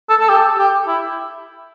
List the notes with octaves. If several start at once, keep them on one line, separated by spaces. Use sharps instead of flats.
A4
A4
G4
G4
E4